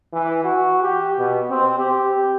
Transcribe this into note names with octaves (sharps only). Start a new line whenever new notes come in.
E3
F#4
G4
B2
C4
G4